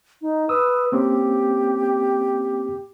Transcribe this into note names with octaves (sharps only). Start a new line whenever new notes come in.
D#4
B4 D#6 E6
A#3 C4 C#4 G4